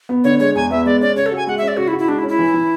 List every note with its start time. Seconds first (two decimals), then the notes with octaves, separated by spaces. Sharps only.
0.09 B3
0.24 D3 C#5
0.40 G#3 C#5
0.55 E2 G#5
0.70 B3 E5
0.86 G#3 D5
1.01 C#4 D5
1.16 C#3 C#5
1.26 A4
1.32 F#4 G#5
1.47 G#3 F#5
1.58 E5
1.62 C#4
1.68 D5
1.77 C#3 F#4
1.88 E4
1.93 F#4
1.99 E4
2.08 G#3 D4
2.18 E4
2.23 C#4
2.28 E4
2.39 E3
2.54 E3